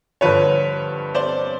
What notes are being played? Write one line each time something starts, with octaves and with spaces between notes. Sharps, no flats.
G2 D3 F3 B4 C#5
C5 D5